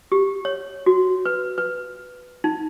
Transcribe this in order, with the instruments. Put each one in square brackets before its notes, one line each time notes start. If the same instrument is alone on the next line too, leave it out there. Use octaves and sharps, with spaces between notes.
[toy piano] G4
C#5
F#4
B4
B4
D#4